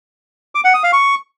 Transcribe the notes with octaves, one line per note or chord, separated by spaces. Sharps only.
D6
F#5
D#6
F5
C#6